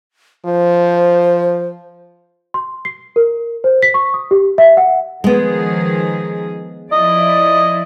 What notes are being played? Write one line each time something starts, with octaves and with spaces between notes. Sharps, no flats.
F3 C5
C6
C7
A#4
C5
B6
C#6
D#6
G4
E5
F#5
D#3 F3 G#3 B3 G#4
F3 E4 D5 D#5